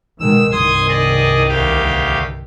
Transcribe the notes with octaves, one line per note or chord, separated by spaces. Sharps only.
B2 D#3 G#3 E6
C2 G2 D#3 C6 D#6 G#6
G#4 D5 D#5
D2 G4 F5